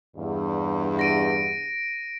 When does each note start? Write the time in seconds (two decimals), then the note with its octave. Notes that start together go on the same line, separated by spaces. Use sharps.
0.17 E2 G2
0.99 A#6 D7 D#7